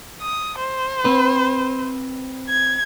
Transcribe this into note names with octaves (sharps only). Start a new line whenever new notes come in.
D#6
C5
C4 B4
G#6